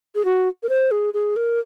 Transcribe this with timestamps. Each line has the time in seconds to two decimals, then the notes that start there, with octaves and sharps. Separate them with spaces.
0.15 G#4
0.25 F#4
0.63 A#4
0.69 C5
0.91 G#4
1.14 G#4
1.36 A#4